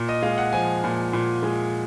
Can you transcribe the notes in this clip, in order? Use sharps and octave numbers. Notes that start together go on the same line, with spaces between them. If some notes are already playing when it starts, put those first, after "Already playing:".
Already playing: A#2
D#5
G#3 F5
F#5
F3 G#5
A#2
A#2
G#3